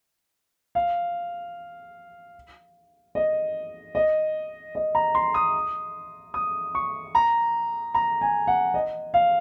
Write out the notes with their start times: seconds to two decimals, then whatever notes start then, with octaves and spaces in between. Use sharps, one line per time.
0.75 F5
3.15 D#5
3.95 D#5
4.75 D#5
4.95 A#5
5.15 C6
5.34 D#6
6.34 D#6
6.75 C#6
7.15 A#5
7.94 A#5
8.21 G#5
8.47 F#5
8.74 D#5
9.14 F5